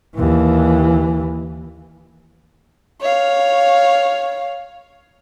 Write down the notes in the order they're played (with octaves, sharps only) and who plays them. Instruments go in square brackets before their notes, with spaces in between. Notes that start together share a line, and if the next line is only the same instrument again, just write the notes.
[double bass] D#2 E3
[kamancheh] C#5 F5